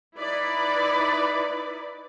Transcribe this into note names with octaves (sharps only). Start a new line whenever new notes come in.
D#4 E4 B4 D5